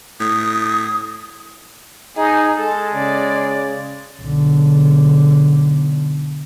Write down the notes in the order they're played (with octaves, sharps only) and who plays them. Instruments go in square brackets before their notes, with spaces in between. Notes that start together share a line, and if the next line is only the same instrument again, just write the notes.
[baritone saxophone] A2 [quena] D#6
[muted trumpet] D#4 [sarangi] G#4
[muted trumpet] G#3 [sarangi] A4
[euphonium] C#3 [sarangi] D5
[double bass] B1 D3